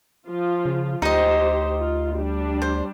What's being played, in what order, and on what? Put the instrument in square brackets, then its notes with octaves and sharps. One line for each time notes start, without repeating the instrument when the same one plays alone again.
[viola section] F3 F4
[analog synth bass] C#3
[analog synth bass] D2 [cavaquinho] D#4 D#5 [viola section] G4 C5
[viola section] F4
G3 D4
[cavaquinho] C5